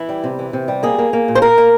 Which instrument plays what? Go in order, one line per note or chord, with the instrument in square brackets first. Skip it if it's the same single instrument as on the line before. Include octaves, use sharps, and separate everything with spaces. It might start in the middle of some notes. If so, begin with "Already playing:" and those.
Already playing: [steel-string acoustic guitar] E3 E4
G3
C3
E3
C3
G3
A#3 G#4
A#3
A#3
A#2
C5
A#2 A#4
A#3